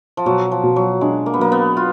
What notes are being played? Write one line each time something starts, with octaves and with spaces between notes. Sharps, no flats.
F3
B2 F#3
F3
B2
F#3
G#3 D4
A#3
B3
F#3 A#3
B3
F4